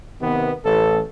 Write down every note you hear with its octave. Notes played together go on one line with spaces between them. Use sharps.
C3 D#3 B3
A1 A4